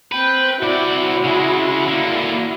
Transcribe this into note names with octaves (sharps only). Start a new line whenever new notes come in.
C4 B4 G5
C3 E4 F#4 D5
C#3 G#3
D3 A#3